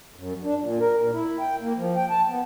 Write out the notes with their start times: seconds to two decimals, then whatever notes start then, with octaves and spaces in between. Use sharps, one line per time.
0.16 F#2
0.43 D4
0.61 A#2
0.79 A#4
0.99 A#2
1.13 E4
1.40 G5
1.61 A#3
1.77 F3
1.96 G5
2.10 A5
2.28 B3